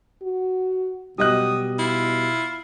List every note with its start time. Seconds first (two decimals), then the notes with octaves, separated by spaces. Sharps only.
0.23 F#4
1.18 B2 F#3 G3 D#5 D#6 F#6
1.79 E4 F4